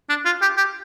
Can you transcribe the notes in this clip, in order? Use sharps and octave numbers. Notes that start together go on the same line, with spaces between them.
D4
F4
G4
G4